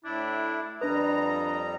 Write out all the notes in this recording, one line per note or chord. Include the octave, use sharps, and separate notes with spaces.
A2 D4 E4
F2 G3 D4 B4 D#5 A#5